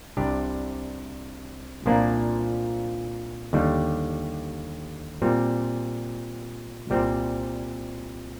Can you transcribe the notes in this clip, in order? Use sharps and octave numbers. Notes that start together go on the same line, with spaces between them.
C2 C3 G3 D4 G4
C2 A#2 F3 A#3 D4
D#2 D3 G3
A#2 G3 C4
C2 A#2 G3 C4